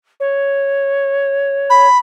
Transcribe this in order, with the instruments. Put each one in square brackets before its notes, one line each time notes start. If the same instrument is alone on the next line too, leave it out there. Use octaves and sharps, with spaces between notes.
[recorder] C#5
[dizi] B5